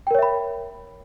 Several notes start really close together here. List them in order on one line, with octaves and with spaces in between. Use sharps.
G5 A#4 C#5 E5 B5